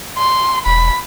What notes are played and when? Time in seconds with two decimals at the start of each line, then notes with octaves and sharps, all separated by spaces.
0.19 C6
0.66 E1 B5